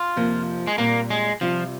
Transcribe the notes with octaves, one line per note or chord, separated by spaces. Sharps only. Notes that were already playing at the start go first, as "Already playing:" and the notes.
Already playing: F4
F2 C3 F3 A#3
G#3
A#2 G3 A#3 C4
G#3
C3 F3 G3 C4 F4